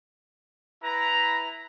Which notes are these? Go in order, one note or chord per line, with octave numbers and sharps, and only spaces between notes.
E4 B4 A#5